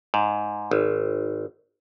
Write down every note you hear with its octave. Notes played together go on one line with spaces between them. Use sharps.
G#2
G#1